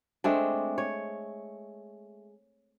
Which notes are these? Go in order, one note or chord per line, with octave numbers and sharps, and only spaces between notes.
G#3 A3 C4 D4
C#5